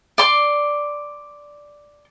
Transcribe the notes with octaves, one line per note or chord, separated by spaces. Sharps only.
D5 C6 D6